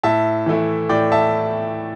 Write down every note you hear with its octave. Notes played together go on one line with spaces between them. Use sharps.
A2 E5 A5
E3 A3 E4
A2 D5 G5
E5 A5